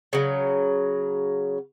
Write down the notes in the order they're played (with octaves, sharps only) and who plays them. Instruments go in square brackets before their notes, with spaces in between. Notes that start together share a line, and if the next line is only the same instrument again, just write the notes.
[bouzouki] C#3 F#3